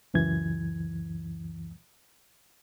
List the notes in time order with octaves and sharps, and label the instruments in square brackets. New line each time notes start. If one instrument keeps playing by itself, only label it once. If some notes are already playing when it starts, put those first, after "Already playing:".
[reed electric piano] C#2 F#2 E3 G#6